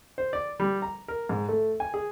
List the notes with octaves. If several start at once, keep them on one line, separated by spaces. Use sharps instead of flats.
C5
D5
G3
A#5
A#4
G#2
A3
G#5
G#4